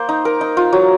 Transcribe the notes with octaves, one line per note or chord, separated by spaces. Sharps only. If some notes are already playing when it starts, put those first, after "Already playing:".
Already playing: A#3 C5
D#4
A#4
D#4
F4
F#3